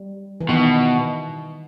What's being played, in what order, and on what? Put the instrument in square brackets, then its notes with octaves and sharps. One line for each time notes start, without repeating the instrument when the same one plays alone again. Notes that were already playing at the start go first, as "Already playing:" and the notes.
Already playing: [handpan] G3
E3
[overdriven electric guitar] B2 [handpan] D#3